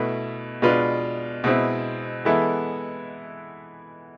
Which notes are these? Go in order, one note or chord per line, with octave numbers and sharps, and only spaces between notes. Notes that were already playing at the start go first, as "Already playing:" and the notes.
Already playing: B2 A3 E4 B4
B2 G#3 D4 F4 B4
B2 G#3 C4 E4
E3 G#3 B3 E4 A4